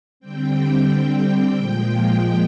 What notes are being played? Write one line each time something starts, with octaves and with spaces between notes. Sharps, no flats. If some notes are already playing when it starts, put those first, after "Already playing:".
D3 G3 C4 G5
A#2 F3 G#3 G5